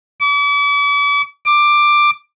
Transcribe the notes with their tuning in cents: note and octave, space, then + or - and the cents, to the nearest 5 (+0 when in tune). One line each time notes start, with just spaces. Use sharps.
D6 -45
D6 +10